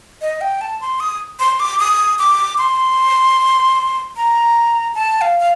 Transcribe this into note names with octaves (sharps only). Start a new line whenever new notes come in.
D#5
G5
A5
C6
D#6
C6
D6
D#6
D6
C6
A#5
A5
F5
F5